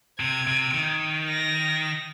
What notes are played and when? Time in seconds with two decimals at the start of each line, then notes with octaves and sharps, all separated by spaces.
0.19 C3 G#6
0.47 C3
0.74 D#3
1.30 A#6